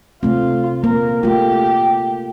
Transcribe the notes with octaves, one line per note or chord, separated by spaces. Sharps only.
C3 A3 C4 F4
A#3 A#4
A3 F4 G4